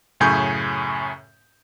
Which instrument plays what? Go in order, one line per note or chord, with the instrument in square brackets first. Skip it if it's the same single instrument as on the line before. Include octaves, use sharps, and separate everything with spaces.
[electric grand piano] F#2 A2 C#3 G#5 C#6 G6